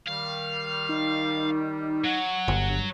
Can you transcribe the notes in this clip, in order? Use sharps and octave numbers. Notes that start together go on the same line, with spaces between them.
D#3 G3 F5
D#4
F#3 F#5
G1
G2